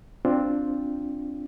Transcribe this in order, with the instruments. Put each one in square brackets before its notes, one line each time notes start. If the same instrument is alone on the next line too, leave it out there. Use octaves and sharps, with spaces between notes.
[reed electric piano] C4 D4 F4